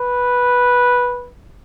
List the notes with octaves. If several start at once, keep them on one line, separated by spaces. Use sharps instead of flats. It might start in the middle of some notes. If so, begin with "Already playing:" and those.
Already playing: B4